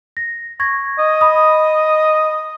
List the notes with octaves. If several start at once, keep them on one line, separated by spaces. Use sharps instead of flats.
A#6
C#6 G#6 A#6
D#5
B5 D#6